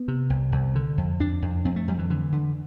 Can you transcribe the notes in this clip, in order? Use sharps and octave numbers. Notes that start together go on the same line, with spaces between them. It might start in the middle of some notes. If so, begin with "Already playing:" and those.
Already playing: B3
C3
C2
C2
D3
F2
F2 D4
F2
F2 C4
A3
F2 G3
E3
D3 E3
D3